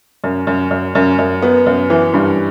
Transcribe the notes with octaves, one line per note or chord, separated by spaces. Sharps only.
F#2
F#2
F#2
F#2
F#2
B3
F#2
E3
G2